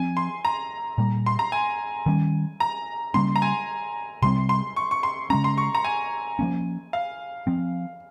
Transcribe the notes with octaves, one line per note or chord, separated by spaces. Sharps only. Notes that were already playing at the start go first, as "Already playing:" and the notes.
Already playing: F3 C4 G#5
C6
A#5
A#2 G3 A#3
C6
A#5
G#5
D#3 G3 C#4
A#5
C#3 G3 A#3 C#4 C6
A#5
G#5
C3 G3 C4 C6
C6
C#6
C#6
C6
C#3 G#3 C#4 A#5
C6
C#6
A#5
G#5
F3 A#3 C#4
F5
F3 C4